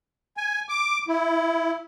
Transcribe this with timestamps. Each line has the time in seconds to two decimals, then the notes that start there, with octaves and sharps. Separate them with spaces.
0.37 G#5
0.69 D6
1.08 E4